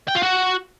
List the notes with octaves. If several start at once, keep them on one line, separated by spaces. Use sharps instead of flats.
G5
F4
F#4